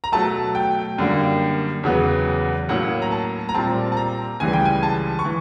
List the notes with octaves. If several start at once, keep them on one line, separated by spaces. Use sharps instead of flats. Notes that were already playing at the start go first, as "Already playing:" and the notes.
A#5
B2 F#3 A3 A5
G5
F#2 D3 G3 A#3
E2 C#3 F#3 B3
A2 F#3 A#3 C#4 F#5
A#5
A5
A#5
A#2 G3 C4 A5
A5
A#5
C#2 C#3 E3 G3 G#5
G5
G#5
A5
C#6
E3